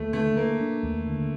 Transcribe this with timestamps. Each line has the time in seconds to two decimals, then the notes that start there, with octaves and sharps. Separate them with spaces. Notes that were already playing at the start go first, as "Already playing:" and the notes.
Already playing: D#2 A3
0.13 D3 A3
0.37 A3 A#3
0.60 D4
0.83 D#2
1.06 D3